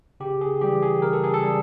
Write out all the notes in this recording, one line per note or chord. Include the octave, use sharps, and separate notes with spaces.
C#3 G4
G#4
E3 G3 G4
G#4
C#3 A#4
A4
G#4
A4
G3